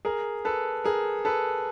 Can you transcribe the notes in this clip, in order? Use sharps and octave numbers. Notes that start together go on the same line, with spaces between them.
G#4 A#4
A4 B4
G#4 A#4
A4 B4